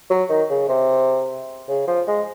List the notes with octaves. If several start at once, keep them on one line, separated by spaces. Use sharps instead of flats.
F#3
D#3
C#3
C3
C#3
F3
G#3